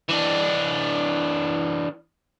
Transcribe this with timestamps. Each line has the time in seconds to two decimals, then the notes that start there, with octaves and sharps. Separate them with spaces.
0.09 E3 D4